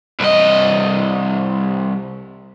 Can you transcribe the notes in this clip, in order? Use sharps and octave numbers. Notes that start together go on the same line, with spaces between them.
C2 D#5